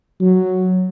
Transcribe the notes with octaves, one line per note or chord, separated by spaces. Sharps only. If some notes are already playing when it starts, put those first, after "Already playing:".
F#3